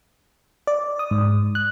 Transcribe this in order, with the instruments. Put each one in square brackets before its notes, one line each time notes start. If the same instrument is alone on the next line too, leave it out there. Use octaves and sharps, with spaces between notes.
[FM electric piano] D5
D#6
G#2
F#6